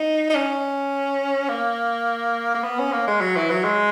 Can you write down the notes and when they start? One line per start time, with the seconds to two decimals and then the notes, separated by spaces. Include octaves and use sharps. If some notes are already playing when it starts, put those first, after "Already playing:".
Already playing: D#4
0.30 D#4
0.35 C#4
1.49 A#3
2.55 A#3
2.64 B3
2.79 C#4
2.93 A#3
3.08 G#3
3.21 F#3
3.36 E3
3.50 F#3
3.64 G#3